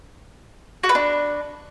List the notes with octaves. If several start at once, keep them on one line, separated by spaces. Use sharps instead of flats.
F#4
B4
D4